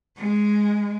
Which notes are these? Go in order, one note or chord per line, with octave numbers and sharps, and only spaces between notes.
G#3